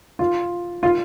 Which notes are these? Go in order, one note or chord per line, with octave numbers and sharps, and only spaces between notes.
F4
F4